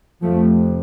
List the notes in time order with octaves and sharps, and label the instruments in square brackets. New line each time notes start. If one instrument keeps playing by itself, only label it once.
[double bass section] F2 C3 F3 A3